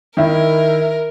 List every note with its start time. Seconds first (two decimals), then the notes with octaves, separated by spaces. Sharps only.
0.17 D#3 E4 A#4